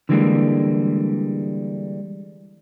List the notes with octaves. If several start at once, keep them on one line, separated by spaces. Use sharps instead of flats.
D3 E3 G3 G#3 A#3